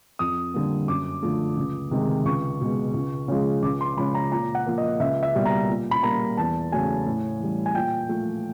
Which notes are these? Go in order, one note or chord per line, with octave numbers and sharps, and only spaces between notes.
F2 D#6
D3 G3 A#3
F#2 D6
D3 F3 A3
C#2
C3 D#3 G#3
C#2 C#6
B2 G#3
C#2
C#3 F3 G#3
C#2 D6
C6
C#3 F3 G#3 B5
A#5
A#2 A#5
F#5
F3 A#3
D#5
C#2 E5
E5
B2 G3 A#3
A#5
A#2
B5
G3 A#3 A#5
E2 A5
C#3 F#3 A3 G#5
A2
E3 G3
G#5
A#2 G5
F3 A3